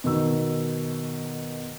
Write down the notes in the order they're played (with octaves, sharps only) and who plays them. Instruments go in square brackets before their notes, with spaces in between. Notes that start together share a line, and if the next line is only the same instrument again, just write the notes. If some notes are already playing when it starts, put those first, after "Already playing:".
[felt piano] B2 D#3 E6